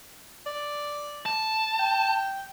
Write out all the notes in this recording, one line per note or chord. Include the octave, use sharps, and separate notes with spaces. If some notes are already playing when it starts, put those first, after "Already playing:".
D5
A5
G5